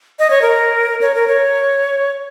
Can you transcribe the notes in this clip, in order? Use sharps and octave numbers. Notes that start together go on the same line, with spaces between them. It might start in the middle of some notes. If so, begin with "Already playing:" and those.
D#5
C#5
A#4
C#5
A#4
C#5